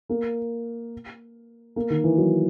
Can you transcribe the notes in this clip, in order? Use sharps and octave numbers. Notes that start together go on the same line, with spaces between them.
A#3
A#3
D#3
E3
F#3